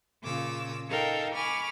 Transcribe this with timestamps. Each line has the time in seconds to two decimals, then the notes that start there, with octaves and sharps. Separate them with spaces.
0.22 A#2 C#3 F4 D6 E6
0.88 D#4 A4 A#4 F5 G5
1.35 G#5 B5 C#6 D6 F6